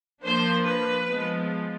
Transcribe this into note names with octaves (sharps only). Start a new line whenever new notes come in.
F3 A#3 D4 C5
B4
F3 G#3 B3